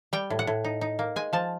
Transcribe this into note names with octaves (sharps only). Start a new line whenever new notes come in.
G3 G5
A2
F#5
A2
D#4
D#4
A#3
G#3 G#5
F3 A5